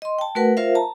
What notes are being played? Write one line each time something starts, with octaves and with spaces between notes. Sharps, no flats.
D#5 C6
G5 A5
A3 F#4 A#4 B4 F#5
F4 A#4 C5 E5 F5
A5 A#5